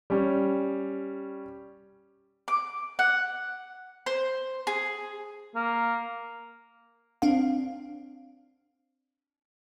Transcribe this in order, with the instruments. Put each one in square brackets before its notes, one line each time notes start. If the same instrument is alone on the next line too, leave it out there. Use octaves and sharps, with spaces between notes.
[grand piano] G3 C#4
[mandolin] D6
F#5
C5
G#4
[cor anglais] A#3
[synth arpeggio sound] C4 D4 F5